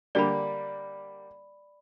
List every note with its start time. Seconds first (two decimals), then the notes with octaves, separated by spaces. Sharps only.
0.15 D3 G3 A#3 D5 B5